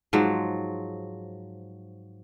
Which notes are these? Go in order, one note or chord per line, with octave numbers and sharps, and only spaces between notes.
G#2 F3 F#3